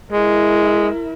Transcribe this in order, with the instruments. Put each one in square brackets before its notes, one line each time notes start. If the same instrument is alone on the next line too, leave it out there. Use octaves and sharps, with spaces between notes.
[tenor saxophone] G#3 [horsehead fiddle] E4 A#4